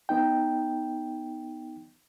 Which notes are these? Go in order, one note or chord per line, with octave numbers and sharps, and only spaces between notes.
B3 D#4 G5